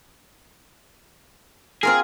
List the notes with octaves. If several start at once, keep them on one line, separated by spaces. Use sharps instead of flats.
C4 F4 G#4 A#4